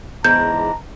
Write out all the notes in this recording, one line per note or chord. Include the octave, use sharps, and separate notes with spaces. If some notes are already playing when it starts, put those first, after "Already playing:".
E2 G#2 D4 A#5 G6